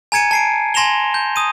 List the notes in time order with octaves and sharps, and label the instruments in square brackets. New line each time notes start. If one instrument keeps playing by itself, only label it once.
[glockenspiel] G#5 A#5 G#6 C#7 D#7
A5 C7 D7
G#5 C6 A#6 E7 F7 G7
G6
D#6 D#7